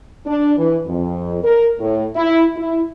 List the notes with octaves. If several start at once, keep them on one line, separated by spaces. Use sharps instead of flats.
D4
E3
F2
A#4
A2
E4
E4